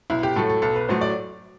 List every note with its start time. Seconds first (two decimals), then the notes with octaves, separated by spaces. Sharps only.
0.10 B1 E4
0.23 G4
0.36 A2 F#3 A3 A4
0.49 A4
0.62 B1 A4
0.76 B4
0.88 A2 F#3 A3 C5
1.01 D5